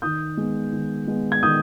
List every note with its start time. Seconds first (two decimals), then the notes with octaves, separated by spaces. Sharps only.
0.02 D#3 D#6 G6
0.37 G#3 B3
0.73 D#3
1.07 G#3 B3
1.32 G#6
1.43 D#3 D#6 G6